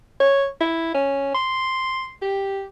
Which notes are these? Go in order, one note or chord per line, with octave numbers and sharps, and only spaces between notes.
C#5
E4
C#4
C6
G4